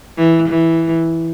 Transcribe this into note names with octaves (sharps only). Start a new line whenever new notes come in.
E3
E3